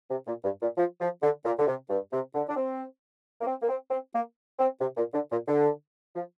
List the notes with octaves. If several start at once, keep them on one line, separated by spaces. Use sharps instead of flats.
C3
A#2
G2
A#2
F3
F3
D3
A#2
D3
C3
G2
C3
D3
D4
C4
A#3
C4
A#3
C4
C4
A#3
C4
C3
A#2
D3
A#2
D3
F3